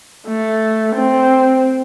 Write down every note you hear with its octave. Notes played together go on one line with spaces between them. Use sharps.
A3
C4